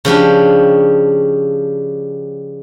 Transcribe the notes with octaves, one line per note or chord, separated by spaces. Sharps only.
C#3 F3 D4 G4